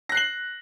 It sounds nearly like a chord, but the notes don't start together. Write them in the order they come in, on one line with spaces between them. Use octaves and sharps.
A#6 F#6 C7 F#7